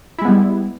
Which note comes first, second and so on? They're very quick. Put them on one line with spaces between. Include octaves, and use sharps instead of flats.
E4 G#3 B3 G3